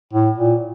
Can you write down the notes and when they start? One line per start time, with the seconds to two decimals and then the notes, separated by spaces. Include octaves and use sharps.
0.13 A2
0.37 A#2